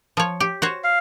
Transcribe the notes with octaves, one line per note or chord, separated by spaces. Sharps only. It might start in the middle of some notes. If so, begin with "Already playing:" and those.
F3 C#5
G4
F#4 C5 C#5
F5